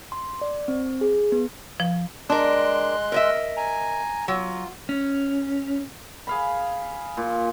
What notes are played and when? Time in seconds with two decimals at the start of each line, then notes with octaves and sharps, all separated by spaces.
0.12 C6
0.41 D5
0.68 C4
1.01 G#4
1.32 B3
1.80 F3
2.30 G#3 D4 A#4 C6 F#6
3.12 A#4 D#5 E5
3.57 G#5 A#5
4.28 F#3 F4
4.89 C#4
6.27 G#4 F5 B5
7.17 A#2